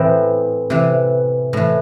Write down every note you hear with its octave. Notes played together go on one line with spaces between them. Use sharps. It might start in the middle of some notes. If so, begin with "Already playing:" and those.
Already playing: A2 E3 C4
C3 E3
A2 E3